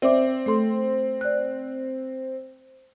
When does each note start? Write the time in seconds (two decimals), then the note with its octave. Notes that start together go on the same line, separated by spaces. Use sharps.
0.02 C4 D5 E5 D6
0.46 A3 A4 C6
1.21 D5 F#6